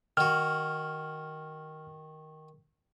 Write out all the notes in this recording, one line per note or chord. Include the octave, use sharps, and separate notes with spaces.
D#3 F#4 F6